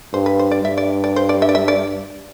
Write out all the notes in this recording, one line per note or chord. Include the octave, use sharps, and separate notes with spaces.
G2 C5
B4
C5
D5
G2 E5
D5
D5
C5
D5
E5
D5
E5
D5